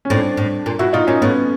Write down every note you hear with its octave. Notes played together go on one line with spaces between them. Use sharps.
C#4
A2 C4 D4
A2
A#2
B2 E4 F#4
B2 D#4 F4
A#2 C#4 D#4
A2 B3 C#4